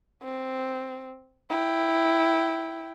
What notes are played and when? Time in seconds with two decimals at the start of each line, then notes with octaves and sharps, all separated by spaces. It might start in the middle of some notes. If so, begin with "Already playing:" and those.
0.22 C4
1.50 E4 G5